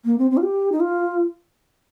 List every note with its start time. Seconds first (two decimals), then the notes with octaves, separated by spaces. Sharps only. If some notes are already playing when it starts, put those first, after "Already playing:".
0.05 A#3
0.18 C4
0.31 C4
0.37 F4
0.43 G4
0.72 D#4
0.80 F4